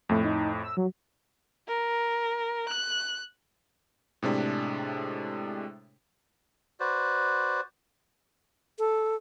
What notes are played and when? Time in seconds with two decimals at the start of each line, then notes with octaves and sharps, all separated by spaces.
0.09 F2 A2 A3
0.25 D#4
0.63 E6
0.77 F#3
1.67 A#4
2.69 F#6
4.22 A2 C3 G#3 D4
6.80 F#4 B4 C5 D5
8.79 A4